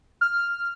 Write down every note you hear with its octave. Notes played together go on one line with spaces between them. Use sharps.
F6